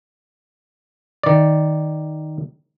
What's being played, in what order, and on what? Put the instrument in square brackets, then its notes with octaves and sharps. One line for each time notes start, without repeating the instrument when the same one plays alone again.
[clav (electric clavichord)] D#3 D5